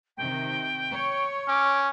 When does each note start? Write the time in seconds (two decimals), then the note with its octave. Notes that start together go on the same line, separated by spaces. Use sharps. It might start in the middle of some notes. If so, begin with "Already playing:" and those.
0.17 C3 D#3 G5
0.91 C#5
1.48 C#4 D6